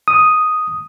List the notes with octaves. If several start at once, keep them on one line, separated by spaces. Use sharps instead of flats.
D#6